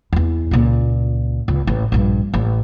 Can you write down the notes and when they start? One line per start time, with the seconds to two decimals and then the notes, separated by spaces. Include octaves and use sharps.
0.13 E2 E3
0.51 C#2 A#2
1.48 C#2
1.67 A1
1.92 A#1 G2
2.34 A1